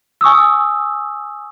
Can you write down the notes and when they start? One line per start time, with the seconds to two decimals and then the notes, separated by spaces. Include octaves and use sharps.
0.21 G#5 C#6 D#6 E6